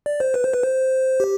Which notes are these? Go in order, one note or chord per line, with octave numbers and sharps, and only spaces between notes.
D5
C5
B4
C5
B4
C5
G4